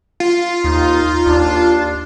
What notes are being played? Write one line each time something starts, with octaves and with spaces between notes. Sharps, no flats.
F4
D#2 D#4
D#2 D4